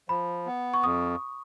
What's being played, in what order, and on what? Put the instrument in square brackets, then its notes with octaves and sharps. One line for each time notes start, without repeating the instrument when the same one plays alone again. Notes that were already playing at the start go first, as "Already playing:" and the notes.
[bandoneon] F3 [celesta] B5
[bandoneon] B3
[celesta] C#6
[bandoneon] F2 [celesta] D#6